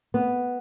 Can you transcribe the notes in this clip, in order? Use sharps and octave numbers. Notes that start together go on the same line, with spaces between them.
B3